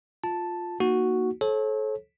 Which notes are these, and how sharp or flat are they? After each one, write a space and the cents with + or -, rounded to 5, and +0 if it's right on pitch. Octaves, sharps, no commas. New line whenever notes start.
F4 +10 A5 +0
A#3 +0 D#4 +0 F#4 +0
A4 -30 C#5 -40